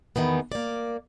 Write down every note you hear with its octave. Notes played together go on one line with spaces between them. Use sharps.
E2 D#3 E3 B3
A#3 D5